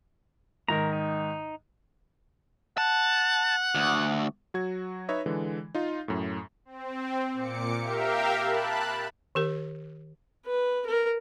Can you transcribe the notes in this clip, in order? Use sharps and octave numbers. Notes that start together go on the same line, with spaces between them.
G#2 D#3 A#4 A#5
D#4
F#5 A5
D2
F#3 F#4 G#6
D#4 B4 C#5 D#5 E5
D3 E3 G#3
D#4 F4
F#2 A2
C4
A#2 D6 C#7
G4 A#4 E5 F5 G5
A5 B5 F#6
D#3 G4 A#4
B4
A#4